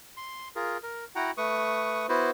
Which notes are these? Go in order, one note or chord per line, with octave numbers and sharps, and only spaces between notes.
C6
F4 G#4 A#4
A#4
E4 F#4 F#5 G5 A#5
A3 B4 C#6 D#6
B3 E4 F#4 B4 C5